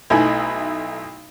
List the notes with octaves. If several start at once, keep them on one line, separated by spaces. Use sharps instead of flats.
B1 A3 D#4 E4 G#5